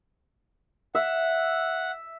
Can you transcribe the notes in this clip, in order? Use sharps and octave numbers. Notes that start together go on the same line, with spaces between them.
E5 F#5